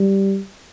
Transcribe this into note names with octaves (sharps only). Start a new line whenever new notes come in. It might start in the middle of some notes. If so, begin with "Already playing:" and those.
Already playing: G3